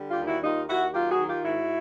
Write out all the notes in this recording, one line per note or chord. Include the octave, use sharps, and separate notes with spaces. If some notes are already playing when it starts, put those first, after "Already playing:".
Already playing: D3 G3
F4 G4
D#2
E4 F#4
D#2 D#4 F4
D#2 E4 F#4
F#3 F4 G4
F#4 G#4
D#3
F4 G4
G#2 E4 F#4